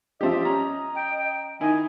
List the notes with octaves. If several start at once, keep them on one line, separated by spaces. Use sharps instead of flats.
F3 G3 G4 C5 D#5 E5
C#4 A#5
G5
D#3 D#4 E4 D#5 G#5